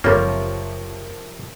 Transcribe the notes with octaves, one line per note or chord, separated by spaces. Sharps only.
F#1 C3 F3 G3 A#3 F4 A#4 C#5